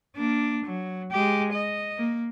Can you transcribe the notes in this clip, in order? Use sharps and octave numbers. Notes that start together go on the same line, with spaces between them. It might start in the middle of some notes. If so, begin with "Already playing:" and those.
A#3 D4
F#3
G#3 G4
D#5
A#3